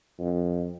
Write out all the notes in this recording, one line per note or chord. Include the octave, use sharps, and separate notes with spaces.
F2